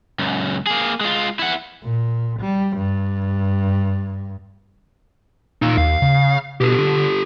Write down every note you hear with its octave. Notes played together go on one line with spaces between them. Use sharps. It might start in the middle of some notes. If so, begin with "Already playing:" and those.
C#2 F#2
A#3 G#4
G#3 F4
E4 F#5
A#2
G3
G2
A#2 D#4 F5
D#2 F5
C#3
B2 G4 A4
D3